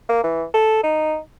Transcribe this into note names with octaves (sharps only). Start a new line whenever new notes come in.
A#3
E3
A4
D#4